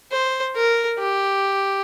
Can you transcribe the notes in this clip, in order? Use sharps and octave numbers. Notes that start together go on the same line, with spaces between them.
C5
A#4
G4